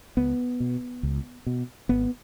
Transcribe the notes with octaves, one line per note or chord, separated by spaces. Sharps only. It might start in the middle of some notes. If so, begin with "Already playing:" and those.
C#2 B3
B2
C#2
B2
G#1 B3